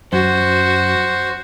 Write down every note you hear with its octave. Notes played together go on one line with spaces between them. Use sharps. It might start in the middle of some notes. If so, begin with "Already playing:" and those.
F#2 F#4 C5